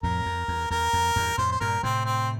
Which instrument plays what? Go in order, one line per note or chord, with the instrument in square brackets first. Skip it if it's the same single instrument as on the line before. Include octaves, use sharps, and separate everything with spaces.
[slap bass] F2 A2 [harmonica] A#4
[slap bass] F2
E2
[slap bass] E2 [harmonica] A#4
[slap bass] F2
E2 G2
[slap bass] F2 A2 [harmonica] C5
[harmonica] C5
[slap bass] G2 A#2 [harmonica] A#4
[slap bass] A2 C3 [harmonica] C4
[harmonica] C4